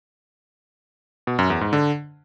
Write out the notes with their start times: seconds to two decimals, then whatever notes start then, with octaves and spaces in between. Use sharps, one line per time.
1.27 B2
1.39 F#2
1.50 E2
1.61 G#2
1.73 D3